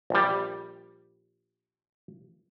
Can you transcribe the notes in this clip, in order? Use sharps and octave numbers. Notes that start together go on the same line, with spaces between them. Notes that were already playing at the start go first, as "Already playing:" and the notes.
A#1 G3